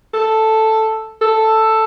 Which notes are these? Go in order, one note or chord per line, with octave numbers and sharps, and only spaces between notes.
A4
A4